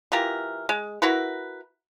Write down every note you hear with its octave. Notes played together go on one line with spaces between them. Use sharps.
E3 F4 G4 A#4
G#3
E4 F#4 A#4 B4